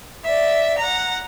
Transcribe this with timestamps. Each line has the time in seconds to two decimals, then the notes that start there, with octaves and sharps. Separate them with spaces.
0.24 D5 E5
0.77 F#5 A#5